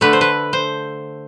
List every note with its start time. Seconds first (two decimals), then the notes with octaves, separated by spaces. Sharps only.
0.01 D3 A3 B4
0.13 C5
0.21 B4
0.53 C5